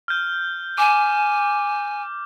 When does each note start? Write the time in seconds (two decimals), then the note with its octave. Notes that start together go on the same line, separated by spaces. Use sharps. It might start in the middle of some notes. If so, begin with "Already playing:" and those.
0.08 F6 G6
0.78 G#5 D6